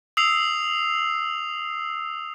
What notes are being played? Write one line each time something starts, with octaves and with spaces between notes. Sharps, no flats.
D#6 E6 C7 F7